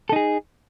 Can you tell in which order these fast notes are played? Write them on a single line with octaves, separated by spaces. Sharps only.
A4 D#4 G#4